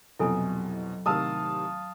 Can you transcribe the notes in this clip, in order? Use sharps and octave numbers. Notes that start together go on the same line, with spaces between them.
C2 F2 B2 F#3 E4 A4 G#5
A2 C3 D#3 F5 A5 D#6 E6